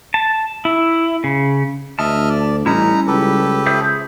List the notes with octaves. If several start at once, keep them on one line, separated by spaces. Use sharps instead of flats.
A5
E4
C#3
D2 D#5 E5 A5 F6
D5
A1 G3 C#4 D#4 E4 A#5
C#2 G4 A4 B4
G#4 C5 E5